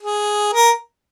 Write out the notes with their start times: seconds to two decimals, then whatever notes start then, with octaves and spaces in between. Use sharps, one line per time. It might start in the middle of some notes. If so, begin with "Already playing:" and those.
0.02 G#4
0.53 A#4